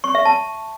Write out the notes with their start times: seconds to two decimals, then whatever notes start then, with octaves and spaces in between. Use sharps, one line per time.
0.04 C#6
0.15 E5
0.25 A5